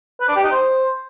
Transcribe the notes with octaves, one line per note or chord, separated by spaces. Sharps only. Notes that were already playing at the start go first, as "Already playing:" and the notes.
B4
D4
G4
D#4
C5